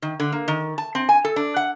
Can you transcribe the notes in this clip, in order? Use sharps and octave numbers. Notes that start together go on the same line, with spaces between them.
D#3
D3
A#3
D#3
A5
C4
G#5
A4
D4
F#5